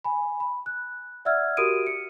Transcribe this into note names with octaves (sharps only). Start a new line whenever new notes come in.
G#5 B5
B5
F#6
D5 E5 F#5 E6 F6 G#6
F#4 G4 A#4 D#6 D7 D#7
C#7